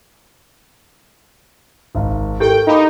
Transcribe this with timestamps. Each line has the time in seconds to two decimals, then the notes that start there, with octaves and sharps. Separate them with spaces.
1.95 G#1 D#4 F5
2.40 E4 G4 A4 A#4 G5
2.67 D#4 F5 B5 D6